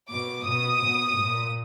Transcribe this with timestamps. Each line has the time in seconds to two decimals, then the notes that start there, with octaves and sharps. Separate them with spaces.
0.10 B2 D6
0.47 B2 D#6
0.84 B2
1.20 A#2